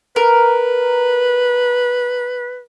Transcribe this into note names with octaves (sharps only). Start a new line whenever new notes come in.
A#4 B4